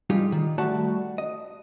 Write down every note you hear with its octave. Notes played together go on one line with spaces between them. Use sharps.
G3 D#4 F4 G4 G#4
D#3
G3 A3 F#4 D5 A5
D#5